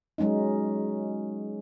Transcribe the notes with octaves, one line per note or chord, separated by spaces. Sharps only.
F#3 G#3 C#4 D#4